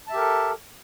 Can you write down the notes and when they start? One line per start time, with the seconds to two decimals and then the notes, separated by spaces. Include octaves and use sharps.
0.07 A5
0.10 E5
0.13 G4
0.16 A#4
0.19 A4